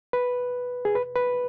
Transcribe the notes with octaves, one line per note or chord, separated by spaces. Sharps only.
B4
G#4
B4
B4